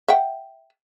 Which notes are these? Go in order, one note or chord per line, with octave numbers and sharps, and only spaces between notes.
E5 F#5 G5